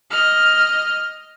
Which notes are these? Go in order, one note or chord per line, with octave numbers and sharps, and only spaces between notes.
D#5 F6